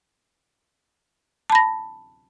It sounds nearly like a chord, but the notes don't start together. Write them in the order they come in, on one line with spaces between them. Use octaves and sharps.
A5 B5 A#6